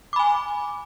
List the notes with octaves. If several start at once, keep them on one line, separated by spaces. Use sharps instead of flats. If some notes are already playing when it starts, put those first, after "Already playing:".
G#5 B5 D6